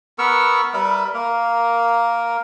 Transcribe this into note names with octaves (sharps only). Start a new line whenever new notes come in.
B3 A#4 C#6 E6
G3 A#4 B4 E5
A#3 A#4